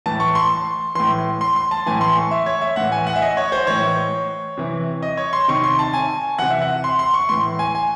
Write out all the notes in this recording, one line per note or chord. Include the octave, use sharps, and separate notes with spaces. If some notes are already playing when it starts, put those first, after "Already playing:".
A2 E3 A5
C#6
C6
C6
A2 E3 C6
C6
C6
A5
A2 E3 G#5
C6
C#6
E5
C#5
E5
A2 E3 F#5
G#5
F#5
E5
D#5
C#5
C5
A2 E3 C#5
C3 E3
D#5
C#5
C6
C3 D#3 C#6
C6
A5
G#5
C3 E3 F#5
E5
F#5
C6
C6
C#6
A2 E3 C6
G#5
G#5